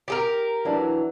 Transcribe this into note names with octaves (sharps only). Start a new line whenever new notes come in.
G4 G#4 A#4
E3 F#3 D4